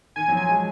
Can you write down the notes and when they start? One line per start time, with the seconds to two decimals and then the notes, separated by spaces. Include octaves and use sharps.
0.16 D#3 G#5
0.28 F#3
0.32 F3
0.37 G#5
0.48 G#3